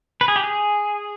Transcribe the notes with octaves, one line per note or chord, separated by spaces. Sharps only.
B4
G#4
G4
G#4